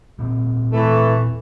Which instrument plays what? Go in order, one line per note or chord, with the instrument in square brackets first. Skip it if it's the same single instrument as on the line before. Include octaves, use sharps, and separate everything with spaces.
[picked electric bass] D#1 A#2 C4
[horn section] E3 A3